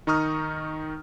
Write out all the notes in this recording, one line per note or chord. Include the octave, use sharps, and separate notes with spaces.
D#3 D#4 A#5 C#6 D#6 F6